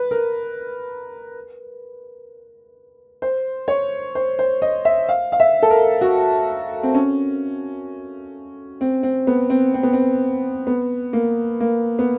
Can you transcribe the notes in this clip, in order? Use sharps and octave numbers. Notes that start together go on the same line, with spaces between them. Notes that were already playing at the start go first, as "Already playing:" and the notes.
Already playing: B4
A#4
C5
C#5
C5
C5
D#5
E5
F5
F5
E5
A4
A#4
F#4
C4
C#4
C4
C4
B3
C4
C4
B3
C4
B3
A#3
A#3
B3